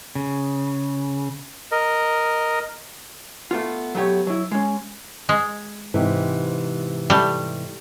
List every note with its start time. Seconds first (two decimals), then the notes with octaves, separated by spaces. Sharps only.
0.15 C#3
1.72 A#4 D#5
3.51 A3 B3 F4
3.95 F#3 A3 B3 G4 C#5
4.27 F#3 E4
4.52 G#3 C#4
5.29 G#3
5.94 G#2 C3 E3
7.10 G3 A3